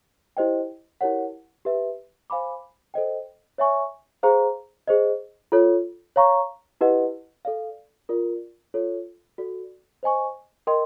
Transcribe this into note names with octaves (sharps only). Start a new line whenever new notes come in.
E4 G4 C5 D#5 G5
E4 G4 A#4 C#5 F#5
G4 B4 E5
C5 F5 G#5 B5 D6
A4 C5 D#5 G5
C#5 E5 G#5 C#6
G#4 C5 F5 A#5
G#4 C5 D#5
F4 A4 C#5
C#5 F5 A#5 C#6
E4 G4 B4 D#5 F#5
A4 D5 F5
F4 A#4 D5
F4 A4 C#5
F#4 A4 D5
C5 D#5 G#5 C#6
A#4 D#5 G5 C6